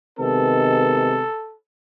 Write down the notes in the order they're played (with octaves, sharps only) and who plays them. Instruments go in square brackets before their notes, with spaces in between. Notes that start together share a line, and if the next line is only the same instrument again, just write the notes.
[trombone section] C3 D#3 G#3 B3 [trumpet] A4